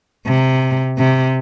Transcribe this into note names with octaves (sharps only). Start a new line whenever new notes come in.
C3
C3